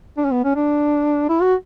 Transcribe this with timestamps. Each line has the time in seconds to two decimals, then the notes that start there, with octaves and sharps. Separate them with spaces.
0.17 D4
0.25 C#4
0.32 B3
0.44 C#4
0.56 D4
1.29 E4
1.42 F#4